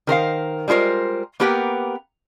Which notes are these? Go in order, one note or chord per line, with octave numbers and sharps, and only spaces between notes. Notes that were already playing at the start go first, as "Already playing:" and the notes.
D#3 A#4 C5 F5
G3 G#3 F4 A#4 C5
A#3 B3 G4 A#4 B4 G5